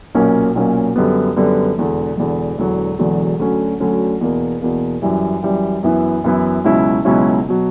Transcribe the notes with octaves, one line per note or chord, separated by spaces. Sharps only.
B1 A#2 A#3 C#4
B1 A#2 A#3 C#4
F#2 D3 G3 B3
F#2 D3 G3 B3
E1 E2 D3
E1 E2 D3
E1 E2 D3 F#3
E1 E2 D3 F#3
D2 D3 F#3 C#4
D2 D3 F#3 C#4
E2 B2 A#3
E2 B2 A#3
F#2 E3 G3
F#2 E3 G3
F#2 E3 B3 E4
F#2 E3 B3 E4
C#2 B2 F#3 C#4 E4
C#2 B2 F#3 C#4 E4
B2 F#3